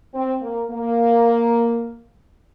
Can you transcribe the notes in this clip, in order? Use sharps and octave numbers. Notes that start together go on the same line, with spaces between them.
C4
A#3
A#3